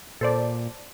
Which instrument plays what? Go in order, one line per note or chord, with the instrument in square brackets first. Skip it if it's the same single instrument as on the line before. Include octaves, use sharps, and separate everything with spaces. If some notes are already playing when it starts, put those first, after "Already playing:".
[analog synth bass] A#2 [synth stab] A4 C5 D5